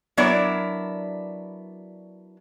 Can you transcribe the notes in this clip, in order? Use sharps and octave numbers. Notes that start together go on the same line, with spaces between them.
F#3 B3 D4 E4 A#4 D5